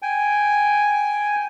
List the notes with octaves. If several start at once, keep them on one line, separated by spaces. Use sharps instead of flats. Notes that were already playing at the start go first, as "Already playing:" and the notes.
G5 G#5